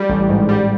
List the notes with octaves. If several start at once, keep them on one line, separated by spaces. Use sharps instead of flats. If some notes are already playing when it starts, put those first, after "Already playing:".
Already playing: G3
A1
G#2
G3